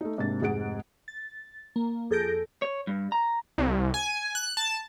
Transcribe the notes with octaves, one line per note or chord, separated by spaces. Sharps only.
A3 D#4
G#2 C3 A#3 D4 A6
F1 G#2 G#4 F#5 D7
A6
A#3
F2 G#4 A4 G6 A#6 D7
C#5
G2
A#5
C2
G#5
F#6
A5